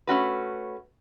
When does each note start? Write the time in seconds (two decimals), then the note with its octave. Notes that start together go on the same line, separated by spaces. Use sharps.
0.07 A3 C#4 F#4 B4